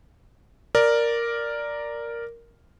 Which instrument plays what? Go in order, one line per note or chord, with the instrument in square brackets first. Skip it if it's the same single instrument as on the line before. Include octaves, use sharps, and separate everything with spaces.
[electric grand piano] A#4 D5